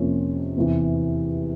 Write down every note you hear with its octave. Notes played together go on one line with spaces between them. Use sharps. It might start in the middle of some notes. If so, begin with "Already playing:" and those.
Already playing: F2 C3 F3 A#3 C#4
E2 C3 E3